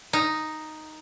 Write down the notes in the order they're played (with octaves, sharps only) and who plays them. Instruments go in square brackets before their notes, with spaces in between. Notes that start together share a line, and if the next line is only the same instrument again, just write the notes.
[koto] D#4